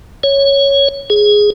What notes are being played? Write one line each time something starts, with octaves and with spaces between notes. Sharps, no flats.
C#5
G#4